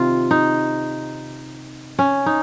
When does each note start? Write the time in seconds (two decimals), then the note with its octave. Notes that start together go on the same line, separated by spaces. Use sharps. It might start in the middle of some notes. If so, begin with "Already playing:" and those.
Already playing: C3 D#3 F4
0.31 D#4
1.99 C#4
2.26 D#4